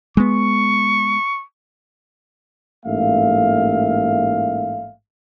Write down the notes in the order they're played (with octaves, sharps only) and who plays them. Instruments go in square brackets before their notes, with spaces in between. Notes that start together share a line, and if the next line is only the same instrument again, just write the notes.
[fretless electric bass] G#3 B3 [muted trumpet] C#6
[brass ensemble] A1 G#2 A3 A#3 E5 F5